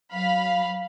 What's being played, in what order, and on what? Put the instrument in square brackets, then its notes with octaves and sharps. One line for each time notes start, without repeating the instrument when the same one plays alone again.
[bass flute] F#3 [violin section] F5 B5